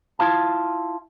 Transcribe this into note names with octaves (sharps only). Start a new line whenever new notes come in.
E4 F4 F5 A5